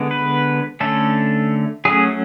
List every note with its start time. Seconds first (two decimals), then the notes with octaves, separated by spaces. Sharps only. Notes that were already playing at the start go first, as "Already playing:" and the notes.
Already playing: D3 G#3 B3
0.11 B4
0.80 D3 A3 C#4 A4
1.85 F#3 A3 C#4 G#4